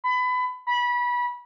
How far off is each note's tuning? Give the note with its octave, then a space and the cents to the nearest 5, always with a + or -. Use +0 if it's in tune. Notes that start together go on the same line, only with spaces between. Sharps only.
B5 +25
B5 -25